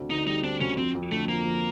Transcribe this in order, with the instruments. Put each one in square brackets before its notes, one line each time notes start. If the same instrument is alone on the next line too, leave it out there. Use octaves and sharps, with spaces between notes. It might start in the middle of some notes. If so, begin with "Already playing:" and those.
Already playing: [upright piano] D2 C4
[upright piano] D3 [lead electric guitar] D#4
[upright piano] G3 [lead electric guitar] D#4
[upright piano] C4 [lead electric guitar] D4
[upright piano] D2 [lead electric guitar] C#4
[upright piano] F2 [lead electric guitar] C4
[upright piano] F2
[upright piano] D3 [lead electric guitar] A3
[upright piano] F3 [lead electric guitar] A#3
[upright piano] F2